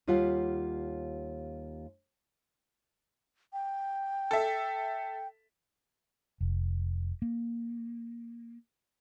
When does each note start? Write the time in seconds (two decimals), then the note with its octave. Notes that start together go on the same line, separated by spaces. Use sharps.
0.07 D#2 G3 F4 F5 F#5
3.53 G5
4.31 A4 E5
6.41 F1
7.22 A#3